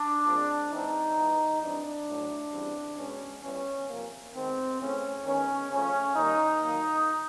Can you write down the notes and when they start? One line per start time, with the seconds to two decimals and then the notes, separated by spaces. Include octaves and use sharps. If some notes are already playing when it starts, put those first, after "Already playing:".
Already playing: D4
0.25 A#2 F3 G#3 C4
0.70 E3 G#3 C4 D#4
1.15 E3 G#3 B3
1.61 E3 G3 C4 D4
2.07 A2 F#3 A3
2.52 C#3 E3 G3 C4
2.97 B2 G#3 B3 C#4
3.42 E3 G3 B3 C#4
3.88 C3 F3 A#3
4.34 D#3 G#3 B3 C4
4.79 C#3 E3 A3 C4 C#4
5.24 D#3 G#3 B3 C#4
5.70 C#3 F3 A3 C#4
6.15 D#3 G3 A#3 D#4
6.61 D#3 F#3 A#3